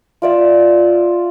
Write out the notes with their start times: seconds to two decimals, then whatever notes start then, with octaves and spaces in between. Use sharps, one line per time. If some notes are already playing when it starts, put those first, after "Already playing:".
0.22 F4 D5 E5